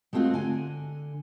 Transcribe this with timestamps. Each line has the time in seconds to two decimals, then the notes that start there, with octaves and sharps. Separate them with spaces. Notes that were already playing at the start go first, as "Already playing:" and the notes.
0.13 G#3 A3 C4 F4 F#4
0.34 D3 G#5